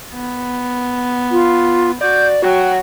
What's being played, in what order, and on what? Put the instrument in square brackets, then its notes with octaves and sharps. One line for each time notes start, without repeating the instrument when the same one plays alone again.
[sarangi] B3
[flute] F4
[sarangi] F#4 [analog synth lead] D5 [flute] G6
[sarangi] F#3 [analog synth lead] F#4 [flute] G5